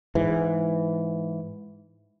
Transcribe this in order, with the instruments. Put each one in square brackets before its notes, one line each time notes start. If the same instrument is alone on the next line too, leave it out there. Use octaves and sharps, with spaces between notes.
[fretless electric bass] G#2 E3